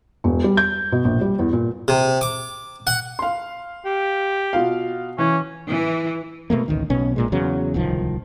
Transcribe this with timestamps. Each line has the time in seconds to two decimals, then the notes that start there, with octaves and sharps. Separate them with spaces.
0.24 E1
0.44 G3
0.57 G6
0.92 B2
1.05 A#1
1.21 G3
1.39 E2
1.53 A#2
1.88 C3
2.21 D6
2.87 F#5
3.19 F5 C6
3.85 G4
4.53 B2 F4 F5
5.18 E3 C#4
5.69 E3
6.50 B2 D#3 A3 A#3
6.68 A1 D2 D#3
6.90 B1 B2 C#4
7.16 A#1 A#2 G#3
7.32 E2 C#3 F#3
7.74 D1 C2 D#3 F3